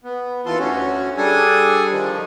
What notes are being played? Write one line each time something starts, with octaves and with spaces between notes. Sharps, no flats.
B3
D#2 E3 F4 A4 C6
D2 C#4 F#4
G3 D4 G#4 A4 G#5 D#6
D3 D#3 F3